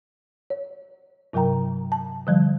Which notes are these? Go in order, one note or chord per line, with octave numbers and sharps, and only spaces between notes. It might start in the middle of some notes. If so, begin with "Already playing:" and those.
C#5
G2 C3 F#3 A#4 G5 A#5
A5
D3 F3 G3